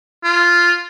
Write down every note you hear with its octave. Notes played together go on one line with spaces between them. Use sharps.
F4